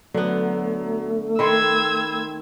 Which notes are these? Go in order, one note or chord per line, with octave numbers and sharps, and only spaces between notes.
D3 F#3 A3 B3
D#3 C4 A4 B5 C6 E6 G#6